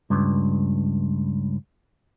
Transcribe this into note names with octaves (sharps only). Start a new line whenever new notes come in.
C#2 G2